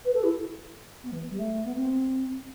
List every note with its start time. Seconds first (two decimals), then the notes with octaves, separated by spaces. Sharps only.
0.05 B4
0.14 A4
0.24 E4
1.03 B3
1.12 E3
1.30 G3
1.39 A3
1.65 B3
1.75 C4